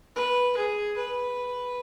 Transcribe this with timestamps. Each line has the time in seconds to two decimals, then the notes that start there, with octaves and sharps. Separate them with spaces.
0.16 B4
0.56 G#4
0.98 B4